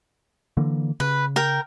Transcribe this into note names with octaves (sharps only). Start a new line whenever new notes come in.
D3 E3 A#3
C#3 B4
A#4 G5